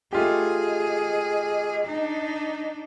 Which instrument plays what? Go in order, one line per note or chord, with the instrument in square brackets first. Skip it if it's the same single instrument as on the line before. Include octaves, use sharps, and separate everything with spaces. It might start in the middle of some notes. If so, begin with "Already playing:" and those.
[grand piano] A3 F4 G4 [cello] G#4 [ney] D#5
[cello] D4 D#4